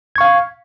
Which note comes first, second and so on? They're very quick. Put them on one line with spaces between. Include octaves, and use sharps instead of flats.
G#6 C#6 F5